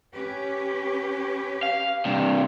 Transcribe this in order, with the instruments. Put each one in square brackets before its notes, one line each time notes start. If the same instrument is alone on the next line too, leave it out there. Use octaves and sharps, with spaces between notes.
[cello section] C#4 G4 B4
[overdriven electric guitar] F5
G2 C3